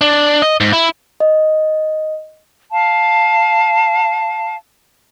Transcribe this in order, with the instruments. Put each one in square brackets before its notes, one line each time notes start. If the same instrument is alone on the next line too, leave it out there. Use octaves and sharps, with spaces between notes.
[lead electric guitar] D4
D#5
G#2
E4
[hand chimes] D#5
[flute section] F5 A5